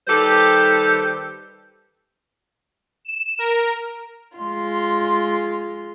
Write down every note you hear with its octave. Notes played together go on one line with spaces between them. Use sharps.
D#3 G3 G4 A4 B4 C5
E7
A#4
G#3 F4 C6